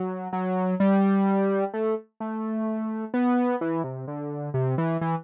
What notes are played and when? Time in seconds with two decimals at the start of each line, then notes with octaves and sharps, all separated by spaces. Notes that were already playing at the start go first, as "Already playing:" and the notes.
Already playing: F#3
0.33 F#3
0.80 G3
1.74 A3
2.20 A3
3.14 B3
3.61 E3
3.84 C3
4.08 D3
4.54 C3
4.78 E3
5.01 E3